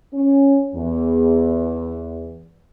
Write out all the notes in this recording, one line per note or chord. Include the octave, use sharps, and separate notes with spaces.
C#4
E2